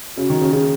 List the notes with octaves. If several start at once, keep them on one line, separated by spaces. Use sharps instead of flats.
C#3 F#4
D#3
C#3
C#3 G#4